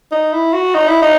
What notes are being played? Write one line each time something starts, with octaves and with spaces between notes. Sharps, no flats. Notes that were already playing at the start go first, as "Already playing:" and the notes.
D#4
E4
F#4
D#4
E4
D#4